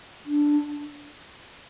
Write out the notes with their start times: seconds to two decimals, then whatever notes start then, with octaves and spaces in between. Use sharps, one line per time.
0.25 D4